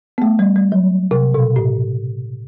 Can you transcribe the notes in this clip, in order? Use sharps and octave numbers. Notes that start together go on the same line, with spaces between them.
B3
A3
G3
G3
F#3
C3
B2
A2